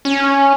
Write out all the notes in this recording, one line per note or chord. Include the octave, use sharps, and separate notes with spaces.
C#4